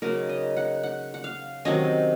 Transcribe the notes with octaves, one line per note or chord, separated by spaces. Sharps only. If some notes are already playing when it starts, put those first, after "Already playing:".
C#3 F#3 A#3 D#4 A#4
D#5
F#5
F#5
F#5
F5
C3 D#3 F#3 C#4 D#5